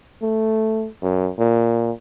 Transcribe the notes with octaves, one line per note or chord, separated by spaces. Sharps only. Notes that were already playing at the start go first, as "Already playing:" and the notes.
A3
F#2
A#2